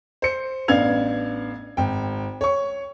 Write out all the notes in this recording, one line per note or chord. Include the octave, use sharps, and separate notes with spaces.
C5 C#7
A1 B3 D4 F5 G#6 F7
G#1 G5
C#5 C#6